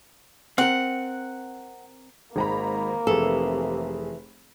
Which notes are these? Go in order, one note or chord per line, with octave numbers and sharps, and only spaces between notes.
C4 A#4 F#5
G#1 G#2 A#3 A#5 B5
F1 C3 E3 G#4 A4